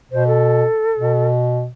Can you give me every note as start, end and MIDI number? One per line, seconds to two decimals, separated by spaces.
0.12 0.65 47
0.12 0.27 72
0.27 1.26 69
0.99 1.69 47